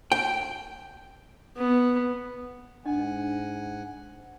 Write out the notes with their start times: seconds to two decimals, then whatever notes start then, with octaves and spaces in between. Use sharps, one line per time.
0.12 G5
1.57 B3
2.85 G#2 D4 D#5 F#5 G#5